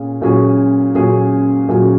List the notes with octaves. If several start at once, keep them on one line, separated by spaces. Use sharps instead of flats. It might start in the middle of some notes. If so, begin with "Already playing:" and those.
Already playing: A#2 C#4 G#4
A#2 F#3 C#4 G#4
A#2 F#3 C#4 G#4
A#2 F#3 C#4 G#4